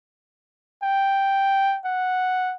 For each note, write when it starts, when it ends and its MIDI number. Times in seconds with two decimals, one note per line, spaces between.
0.83 1.79 79
1.85 2.55 78